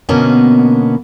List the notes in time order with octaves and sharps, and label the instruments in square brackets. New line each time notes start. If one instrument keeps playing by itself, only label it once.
[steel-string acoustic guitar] B2 D3 A#3 B3 C#4 D#5